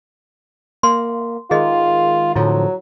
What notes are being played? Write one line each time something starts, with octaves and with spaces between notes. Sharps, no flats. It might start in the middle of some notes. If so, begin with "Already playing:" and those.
A#3 C6
D#3 G#3 F4 G#4 D#5
A2 D3 F3 F#3 E4